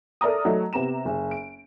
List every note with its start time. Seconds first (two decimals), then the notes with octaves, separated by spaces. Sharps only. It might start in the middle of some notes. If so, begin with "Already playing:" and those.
0.21 A4 A#4 D5 E5 A#5 D#6
0.45 F#3 A3 A4 D#5
0.73 C3 B3 A#5 E7
1.05 F#1
1.31 D7